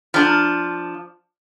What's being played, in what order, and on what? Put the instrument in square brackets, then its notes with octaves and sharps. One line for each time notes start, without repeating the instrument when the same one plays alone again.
[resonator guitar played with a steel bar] F3 D4